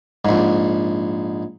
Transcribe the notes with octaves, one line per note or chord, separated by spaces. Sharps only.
A#1 G#2